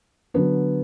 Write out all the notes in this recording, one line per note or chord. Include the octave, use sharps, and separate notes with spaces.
D3 F#3 B3 D4